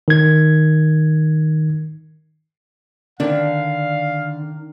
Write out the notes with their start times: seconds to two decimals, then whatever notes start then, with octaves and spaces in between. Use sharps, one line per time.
0.08 D#3 G#6
3.20 D3 D#3 D4 D5 F5